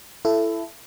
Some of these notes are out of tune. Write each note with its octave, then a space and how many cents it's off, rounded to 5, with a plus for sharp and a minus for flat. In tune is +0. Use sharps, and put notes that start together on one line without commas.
E4 +20 A4 +0